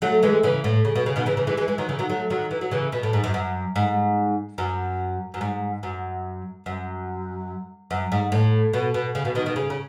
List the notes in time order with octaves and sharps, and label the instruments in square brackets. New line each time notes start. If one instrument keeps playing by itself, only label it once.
[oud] F#3 A3
E3 G#3
C#3 E3
A2
C#3
B2
C#3
B2 D#3
C#3 E3
C#3 E3
E3 G#3
E3 G#3
E3 G#3
D#3 F#3
C#3 E3
D#3 F#3
F#3 A3
D#3 F#3
E3
F#3
C#3 E3
B2
A2
G#2
F#2
F#2
G#2
F#2
F#2
G#2
F#2
F#2
F#2
G#2
A2
B2
B2
C#3
B2
B2 D#3
B2 D#3
C#3
C#3